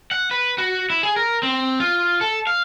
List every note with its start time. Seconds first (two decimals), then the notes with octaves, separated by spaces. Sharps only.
0.11 F#5
0.31 B4
0.58 F#4
0.90 E4
1.03 G#4
1.16 A#4
1.43 C4
1.80 F4
2.21 A4
2.47 F5